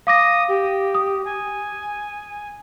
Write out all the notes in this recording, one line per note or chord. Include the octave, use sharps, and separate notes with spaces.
F5 D6 D#6 A#6
G4
D#6
G#5